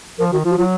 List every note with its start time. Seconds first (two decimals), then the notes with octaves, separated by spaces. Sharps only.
0.19 F3 A#4
0.32 D#3 F#4
0.45 F3 F4
0.51 F#4
0.58 F#3 F4